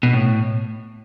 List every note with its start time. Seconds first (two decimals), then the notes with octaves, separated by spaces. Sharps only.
0.03 B2
0.13 A2